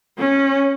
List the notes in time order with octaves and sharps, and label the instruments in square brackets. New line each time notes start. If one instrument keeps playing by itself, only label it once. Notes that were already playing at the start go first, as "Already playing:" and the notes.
[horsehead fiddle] C#4